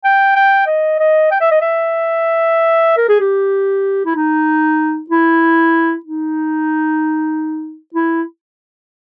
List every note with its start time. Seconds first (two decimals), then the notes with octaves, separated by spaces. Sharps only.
0.04 G5
0.36 G5
0.67 D#5
1.00 D#5
1.31 G5
1.41 E5
1.52 D#5
1.62 E5
2.97 A#4
3.09 G#4
3.20 G4
4.06 E4
4.16 D#4
5.10 E4
6.06 D#4
7.95 E4